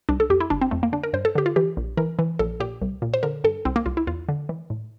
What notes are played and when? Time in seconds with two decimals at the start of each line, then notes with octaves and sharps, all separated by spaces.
0.09 C2 D4
0.20 A4
0.30 F2 G4
0.40 E4
0.50 G1 D4
0.61 C4
0.71 F2 A3
0.83 A#3
0.93 D3 D4
1.03 A#4
1.13 G2 C5
1.25 A4
1.35 D3 G4
1.46 F4
1.56 E3 G4
1.77 A#1
1.97 E3 A#4
2.19 E3
2.39 A#1 A4
2.60 A#2 G4
2.82 C2
3.02 A#2
3.14 C5
3.23 D3 A#4
3.44 G2 A4
3.65 C2 C4
3.76 A#3
3.86 C2 F4
3.97 E4
4.07 E2 F4
4.29 D3
4.49 E3
4.70 A2